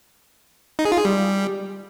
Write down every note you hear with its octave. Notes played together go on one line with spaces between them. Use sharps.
D#4
G#4
F4
G#4
G3